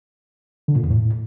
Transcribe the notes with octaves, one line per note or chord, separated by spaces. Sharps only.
D3
A#2
E2
A2